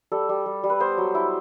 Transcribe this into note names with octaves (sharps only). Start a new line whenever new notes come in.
G3 A4
G3
G3
G3
B4
B3 C5
F#3
E4